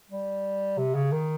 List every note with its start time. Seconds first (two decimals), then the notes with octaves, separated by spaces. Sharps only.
0.10 G3
0.78 C3
0.95 C#3
1.12 D#3